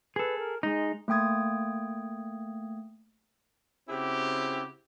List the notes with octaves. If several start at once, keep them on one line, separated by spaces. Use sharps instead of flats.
G#4 A4 B4
A#4
G#3 D#4
A3 A#3 G5 D#6 G#6
C#3 C4 E4 F#4 G4